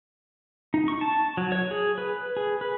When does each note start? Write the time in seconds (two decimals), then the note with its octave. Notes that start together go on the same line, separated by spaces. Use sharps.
0.74 D#4
0.88 C#6
1.01 A5
1.37 F#3
1.52 C#5
1.71 G#4
1.98 B4
2.37 G#4
2.61 B4